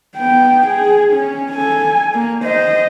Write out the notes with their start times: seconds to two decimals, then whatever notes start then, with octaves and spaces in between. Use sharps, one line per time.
0.17 B3 G5
0.67 G#4
1.13 C#4
1.51 A4 G#5
2.14 A#3
2.44 C5 D#5